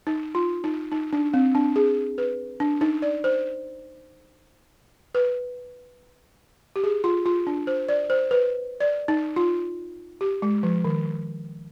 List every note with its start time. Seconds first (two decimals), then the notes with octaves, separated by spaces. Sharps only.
0.07 D#4
0.35 F4
0.64 D#4
0.92 D#4
1.13 D4
1.34 C4
1.55 D4
1.76 G#4
2.18 B4
2.60 D4
2.81 D#4
3.02 D5
3.24 C5
5.15 B4
6.76 G4
6.84 G#4
7.04 F4
7.26 F4
7.47 D4
7.67 C5
7.89 D5
8.10 C5
8.31 B4
8.80 D5
9.08 D#4
9.36 F4
10.21 G4
10.42 G#3
10.63 F3
10.85 D#3